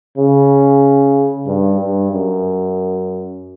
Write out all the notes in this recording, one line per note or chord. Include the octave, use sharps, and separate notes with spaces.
C#3
G2
G2
F#2